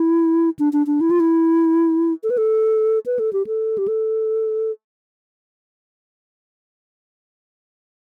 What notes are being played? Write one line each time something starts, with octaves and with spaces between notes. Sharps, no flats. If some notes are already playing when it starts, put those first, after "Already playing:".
Already playing: E4
D4
D4
D4
E4
F4
E4
A4
B4
A4
B4
A4
G4
A4
G4
A4